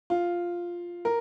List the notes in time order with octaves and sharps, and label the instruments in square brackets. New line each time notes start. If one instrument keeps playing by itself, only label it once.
[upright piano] F4
A#4